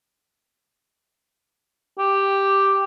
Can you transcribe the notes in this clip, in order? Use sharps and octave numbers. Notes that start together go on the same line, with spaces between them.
G4